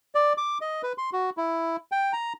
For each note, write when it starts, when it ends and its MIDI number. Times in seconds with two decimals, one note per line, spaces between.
0.15 0.33 74
0.38 0.58 86
0.61 0.82 75
0.83 0.93 71
0.98 1.10 84
1.13 1.30 66
1.37 1.76 64
1.92 2.13 79
2.13 2.33 82